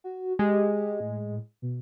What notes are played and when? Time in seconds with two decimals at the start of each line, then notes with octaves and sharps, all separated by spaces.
0.04 F#4
0.39 G#3 G4
1.00 A2
1.62 B2